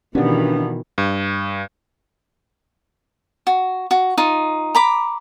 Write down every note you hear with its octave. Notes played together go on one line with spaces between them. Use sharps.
G2 B2 D#3 E3 B3 C#4 D4
G2
F#4
F#4
D#4 F4
A#5 B5 D6